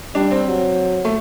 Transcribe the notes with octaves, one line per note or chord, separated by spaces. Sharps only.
G3 D4
C4
F#3
A3